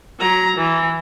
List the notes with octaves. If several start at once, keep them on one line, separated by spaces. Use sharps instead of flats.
F#3 A#5
E3